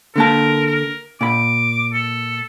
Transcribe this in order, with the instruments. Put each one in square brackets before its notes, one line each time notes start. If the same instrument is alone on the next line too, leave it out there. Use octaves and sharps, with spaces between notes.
[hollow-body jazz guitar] D3 A#3 A5 [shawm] A#4
[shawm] A#4
[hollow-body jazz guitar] A#2 B5 [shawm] D6
[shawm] A4